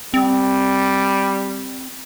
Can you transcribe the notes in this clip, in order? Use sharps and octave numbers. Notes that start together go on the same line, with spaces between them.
G3 C4